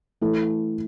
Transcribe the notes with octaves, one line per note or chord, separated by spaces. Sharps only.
E3 A3 E4 A4